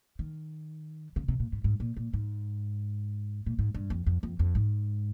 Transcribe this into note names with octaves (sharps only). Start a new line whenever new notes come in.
D#3
C#3
C3
A#2
G#2
G#2
A#2
A#2
G#2
A#2
G#2
G2
F2
F2
F2
F2
G#2